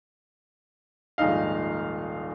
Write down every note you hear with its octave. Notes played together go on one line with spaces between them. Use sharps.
D#1 A#1 G#2 D#4 F5